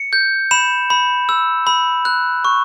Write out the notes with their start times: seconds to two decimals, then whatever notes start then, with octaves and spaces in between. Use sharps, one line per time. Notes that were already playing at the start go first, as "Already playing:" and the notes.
Already playing: C#7
0.13 G6
0.51 B5 E7
0.90 B5
1.29 E6
1.67 B5
2.05 F#6
2.45 C#6